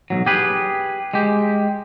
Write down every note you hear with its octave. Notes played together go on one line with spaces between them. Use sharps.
B1 A#2 F#3
G4 G#4 B4
G#3 G4